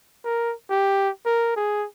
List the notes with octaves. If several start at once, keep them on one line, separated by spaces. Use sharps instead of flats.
A#4
G4
A#4
G#4